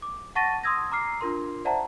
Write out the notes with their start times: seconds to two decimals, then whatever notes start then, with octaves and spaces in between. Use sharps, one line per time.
0.02 D6
0.35 F#5 A5 C#6 A6 A#6 D#7
0.63 C6 D#6 E6 G#6 A#6
0.92 A#5 D6 F6 C7
1.21 D4 F4 A#4 C6
1.65 C5 D5 E5 F#5 A5 A#5